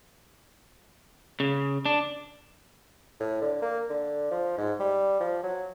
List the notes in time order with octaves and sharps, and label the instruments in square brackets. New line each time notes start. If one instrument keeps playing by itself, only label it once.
[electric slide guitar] C#3
D4
[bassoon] A2
D3
A#3
D3
F3
G#2
G3
F3
F#3